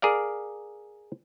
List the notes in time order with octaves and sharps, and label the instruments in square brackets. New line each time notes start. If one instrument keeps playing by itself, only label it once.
[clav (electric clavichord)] G#4 A#4 D5 F5